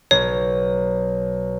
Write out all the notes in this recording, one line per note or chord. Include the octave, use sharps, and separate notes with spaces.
B1 C#5